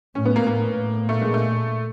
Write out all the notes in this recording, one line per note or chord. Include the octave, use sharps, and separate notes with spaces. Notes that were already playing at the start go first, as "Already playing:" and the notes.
A2 C#4
B3
A#3
A2 A#3
A2
A#2 A3
G#3
A3